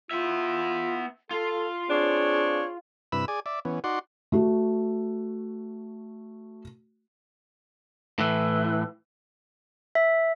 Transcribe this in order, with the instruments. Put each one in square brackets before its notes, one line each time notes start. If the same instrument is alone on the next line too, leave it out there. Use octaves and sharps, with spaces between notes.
[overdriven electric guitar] B3 E5 [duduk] F4
[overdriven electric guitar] F4 [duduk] A4
[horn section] C4 D4 C#5 [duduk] G#4
[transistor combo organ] G2 C3 E4 B4 B5 E6
G#4 D5 G#5
D5 E5
E3 B3 C#4
D#4 F#4 D5 F#5 C6
[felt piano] A3 F#4
[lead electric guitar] A2 E3
[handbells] E5